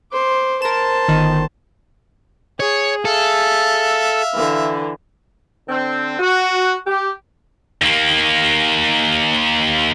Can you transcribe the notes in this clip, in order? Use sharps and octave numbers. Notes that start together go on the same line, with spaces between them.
C5 D6
A#4 C5 A5 E7
G1 D#3
G#4 C#5
A4 E5 F5
D3 E3
D3 C4
F#4
G4
D#2 A#3